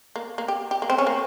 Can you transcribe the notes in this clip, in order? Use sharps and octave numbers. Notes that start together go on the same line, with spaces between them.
A#3
A#3
G4
G4
A#3
C4
C#4
A#3